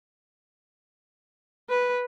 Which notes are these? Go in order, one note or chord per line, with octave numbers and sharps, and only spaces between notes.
B4